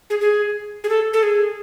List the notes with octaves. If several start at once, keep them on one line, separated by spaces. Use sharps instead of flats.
G#4
G#4
G#4
A4
A4
G#4